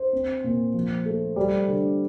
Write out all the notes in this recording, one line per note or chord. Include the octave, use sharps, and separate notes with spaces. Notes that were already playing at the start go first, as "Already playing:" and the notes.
Already playing: C5
C4
A#2
F3
A3
G3 D5
D3